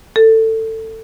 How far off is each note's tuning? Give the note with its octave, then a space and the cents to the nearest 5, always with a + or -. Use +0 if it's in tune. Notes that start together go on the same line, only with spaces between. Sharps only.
A4 +20